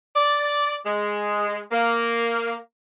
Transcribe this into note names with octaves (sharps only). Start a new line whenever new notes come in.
D5
G#3
A#3